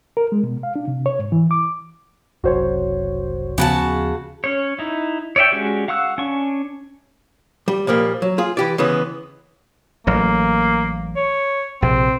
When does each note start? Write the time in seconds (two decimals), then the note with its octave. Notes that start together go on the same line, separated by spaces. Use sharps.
0.17 A#4
0.32 G#3
0.43 B2
0.63 F5
0.76 D4
0.88 C3
1.06 C#5
1.19 G#2
1.32 E3
1.51 D6
2.44 F#1 C2 F#2 F#4 C5 C#5
3.58 D#2 C#3 F3 B3 F#4 A5
4.44 C#4 C#5
4.79 D#4 E4
5.36 C#5 D5 E5 G5
5.52 G#3 C#4 D4 F#4 G4
5.88 F5 F#5 C#6 E6 F#6
6.18 C#4 D4 C#6
7.68 G3
7.87 A#2 F3 G3 A#3
8.22 F#3
8.38 F4 G#4
8.57 E3 G4 D5
8.78 C#3 E3 G#3 B3
10.07 A1 F#3 A#3
11.16 C#5
11.82 A#1 C3 C4